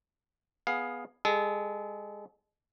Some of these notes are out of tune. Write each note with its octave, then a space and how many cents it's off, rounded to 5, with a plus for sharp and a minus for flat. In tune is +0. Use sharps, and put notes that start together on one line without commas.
B3 +0 G#4 +0 F5 +15
G#3 -25 A4 -35